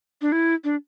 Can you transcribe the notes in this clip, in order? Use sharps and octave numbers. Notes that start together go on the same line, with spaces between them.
D4
E4
D4